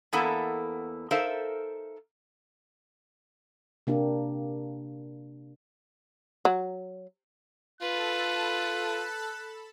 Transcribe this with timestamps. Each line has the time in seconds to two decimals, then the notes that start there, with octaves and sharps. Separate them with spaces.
0.13 E2 A#3 B3 E4 A4 A#5
1.11 D#4 A4 A#4 C5 E5 F5
3.87 C3 A#3 D4 G4
6.45 F#3
7.81 F4 A4 B4 A5 B5 F#6